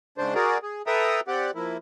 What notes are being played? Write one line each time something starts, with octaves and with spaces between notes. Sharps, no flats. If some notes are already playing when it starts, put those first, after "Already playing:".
G#2 C#3 D4 C5
F#4 G#4 A#4 D5
G#4
A4 B4 E5 G5 A#5 D#6
C4 G4 D5 F#5
F3 A#3 E4